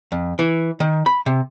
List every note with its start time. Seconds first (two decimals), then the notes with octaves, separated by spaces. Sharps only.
0.12 F2
0.39 E3
0.80 D#3
1.06 B5
1.26 C3